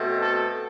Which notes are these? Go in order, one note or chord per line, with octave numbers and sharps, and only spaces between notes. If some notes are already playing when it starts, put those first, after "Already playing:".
Already playing: B2 A3 C4
A4